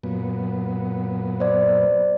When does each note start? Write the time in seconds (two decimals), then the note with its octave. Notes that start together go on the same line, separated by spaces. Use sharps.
0.03 F#2 A#2 B3
1.40 C5 D5